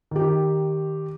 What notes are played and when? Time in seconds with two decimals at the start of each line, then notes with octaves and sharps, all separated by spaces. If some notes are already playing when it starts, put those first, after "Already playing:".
0.11 D#3 G4